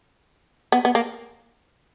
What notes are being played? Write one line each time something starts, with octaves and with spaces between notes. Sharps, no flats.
B3
B3
A#3